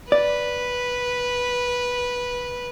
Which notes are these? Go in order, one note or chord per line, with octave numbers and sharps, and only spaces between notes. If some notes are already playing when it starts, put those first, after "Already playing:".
B4 D5